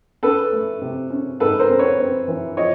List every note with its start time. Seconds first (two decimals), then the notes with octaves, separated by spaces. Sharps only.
0.23 C#4 A4 B4
0.52 A3
0.82 C3
1.10 C#4
1.40 G#2 A4 B4
1.59 A#4 C5
1.69 C4
1.79 B4 C#5
1.99 C4
2.28 E3
2.57 F3 C#5 D#5